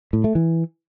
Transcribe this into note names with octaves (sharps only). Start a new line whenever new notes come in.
A2
A3
E3